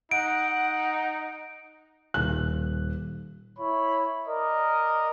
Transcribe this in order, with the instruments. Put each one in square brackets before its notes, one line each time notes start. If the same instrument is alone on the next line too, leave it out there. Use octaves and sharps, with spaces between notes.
[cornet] D#4 [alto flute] F#5 [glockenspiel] D7
[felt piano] D#1 F#6
[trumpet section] E4 C#5 B5
A#4 D5 D#5